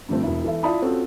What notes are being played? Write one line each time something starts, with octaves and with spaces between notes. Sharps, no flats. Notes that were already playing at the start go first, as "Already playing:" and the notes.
G2 D3 F3 A3 C4
E1 E4
E3 A4 E5
E4 F4 D5 A5 B5 D#6
C4 C#4 F4 F#4 A4